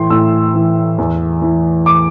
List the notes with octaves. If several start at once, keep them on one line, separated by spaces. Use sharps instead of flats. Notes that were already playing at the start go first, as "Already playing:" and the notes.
Already playing: A2 E3 G5 C6
A2 E6
E3
E2
E3
D6